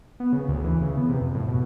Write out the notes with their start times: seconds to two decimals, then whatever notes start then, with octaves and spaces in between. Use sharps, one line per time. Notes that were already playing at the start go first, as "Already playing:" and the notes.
0.20 B3
0.33 C#3
0.48 D2
0.64 E3
0.81 C#3
0.97 B3
1.09 C3
1.21 F2
1.35 A2
1.48 B2